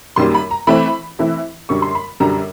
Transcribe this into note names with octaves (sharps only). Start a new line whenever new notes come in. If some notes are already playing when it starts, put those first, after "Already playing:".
F#2 D#3 G3 A#3 C6
B5
A#5
E3 A3 C4 E4 B5
E3 A3 C4 E4
F#2 D3 G3 C#6
C6
B5
F#2 D3 G3 A#5